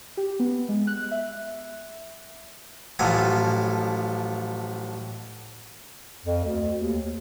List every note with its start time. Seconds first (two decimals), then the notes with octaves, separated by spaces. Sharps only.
0.17 G4
0.40 B3
0.69 G#3
0.87 F#6
1.11 E5
2.99 A1 F#2 A2 F3 G#5
6.25 F2
6.44 D2
6.77 D#2